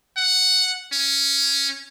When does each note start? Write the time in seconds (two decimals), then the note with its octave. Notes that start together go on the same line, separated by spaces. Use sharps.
0.17 F#5
0.93 C#4